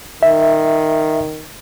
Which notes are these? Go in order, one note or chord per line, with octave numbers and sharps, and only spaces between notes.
D#3 E5